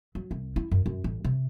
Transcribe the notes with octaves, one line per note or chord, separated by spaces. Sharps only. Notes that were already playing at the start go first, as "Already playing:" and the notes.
F#3
C2
E4
F#2
F#2
A1
C3